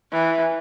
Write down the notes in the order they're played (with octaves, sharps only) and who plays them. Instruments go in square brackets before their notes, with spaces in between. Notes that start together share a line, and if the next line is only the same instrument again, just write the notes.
[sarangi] E3